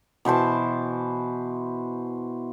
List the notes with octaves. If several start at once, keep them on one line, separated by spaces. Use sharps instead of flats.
B2 E3 C5 A5